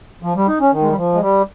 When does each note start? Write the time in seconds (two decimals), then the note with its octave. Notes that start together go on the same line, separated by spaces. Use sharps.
0.23 F3
0.36 G3
0.48 D#4
0.60 C#4
0.72 D#3
0.82 G#3
0.89 G3
0.97 F3
1.14 G#3
1.20 G3